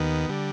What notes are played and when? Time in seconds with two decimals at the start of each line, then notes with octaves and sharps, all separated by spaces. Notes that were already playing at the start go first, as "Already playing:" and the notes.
Already playing: D#2 D#3 B3
0.29 D3 G3